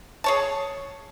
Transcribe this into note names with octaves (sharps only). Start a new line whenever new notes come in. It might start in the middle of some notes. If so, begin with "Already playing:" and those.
G#4 C#5 A5